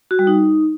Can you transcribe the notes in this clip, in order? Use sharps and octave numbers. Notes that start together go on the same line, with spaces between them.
F#4
G3
D#4